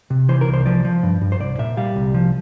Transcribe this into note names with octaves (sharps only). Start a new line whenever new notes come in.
C3
E3 C5
A#4
C2
C5
F3 D5
F3
G2
G2
C5
C2 D5
A#2 E5
G3 F5
C2
F3